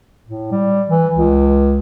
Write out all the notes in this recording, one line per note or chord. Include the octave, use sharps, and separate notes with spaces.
A2
G3
E3
C#2